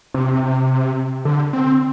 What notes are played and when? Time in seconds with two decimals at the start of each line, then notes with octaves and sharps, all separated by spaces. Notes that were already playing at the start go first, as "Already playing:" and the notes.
0.14 C3
1.25 D3
1.53 C4